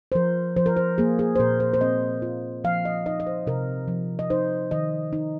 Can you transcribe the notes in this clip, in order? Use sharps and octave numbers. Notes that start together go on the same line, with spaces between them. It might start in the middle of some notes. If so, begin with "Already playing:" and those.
C5
F3 A#4
F3 C5
A#4
C5
A#3 G#4
G#4
C5
A#2 A#4
C5
C5
C4 D#5
F4
F3 F5
D#5
D#4 D#5
D#5
C5
C3 A#4
F3
D#5
D#4 C5
D#3 D#5
D#4